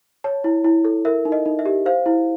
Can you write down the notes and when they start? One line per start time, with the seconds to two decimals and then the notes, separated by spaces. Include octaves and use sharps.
0.24 C#5 A5
0.44 E4
0.64 E4
0.85 A4
1.05 A#4 E5
1.25 D#4
1.32 D#5
1.46 D#4
1.59 E5
1.66 G4
1.86 C5 F5
2.06 E4